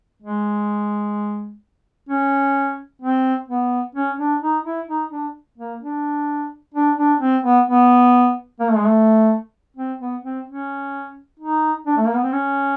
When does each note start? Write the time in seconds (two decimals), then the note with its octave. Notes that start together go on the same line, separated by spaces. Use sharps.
0.22 G#3
2.09 C#4
3.02 C4
3.49 B3
3.95 C#4
4.19 D4
4.42 D#4
4.65 E4
4.88 D#4
5.11 D4
5.58 A#3
5.82 D4
6.74 D4
6.97 D4
7.21 C4
7.44 B3
7.68 B3
8.60 A#3
8.69 A3
8.77 G#3
8.86 A3
9.77 C4
10.00 B3
10.24 C4
10.47 C#4
11.40 D#4
11.87 D4
11.97 A3
12.06 A#3
12.15 B3
12.24 C4
12.33 C#4